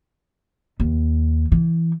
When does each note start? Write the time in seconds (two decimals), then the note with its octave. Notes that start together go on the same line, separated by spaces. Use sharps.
0.80 D#2
1.52 E3